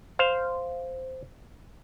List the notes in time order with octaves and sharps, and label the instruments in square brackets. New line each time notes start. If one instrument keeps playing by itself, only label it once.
[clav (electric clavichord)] C5 F5